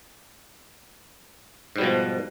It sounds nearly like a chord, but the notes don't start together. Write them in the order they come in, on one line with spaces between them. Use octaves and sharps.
G#2 G3 B2 F3